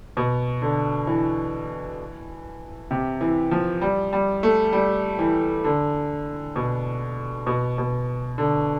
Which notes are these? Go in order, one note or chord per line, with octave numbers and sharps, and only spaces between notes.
B2
D3
E3
C3
E3
F3
G3
G3
A3
G3
E3
D3
B2
B2
B2
D3